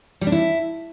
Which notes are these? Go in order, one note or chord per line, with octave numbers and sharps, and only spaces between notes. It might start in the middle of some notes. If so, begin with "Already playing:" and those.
G3
D4
E4